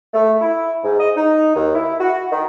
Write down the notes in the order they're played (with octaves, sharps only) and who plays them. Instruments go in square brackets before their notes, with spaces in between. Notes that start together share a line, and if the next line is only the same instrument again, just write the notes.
[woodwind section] A3
E4
G#2
D#5
D#4
D#2
E4
F#4
D#3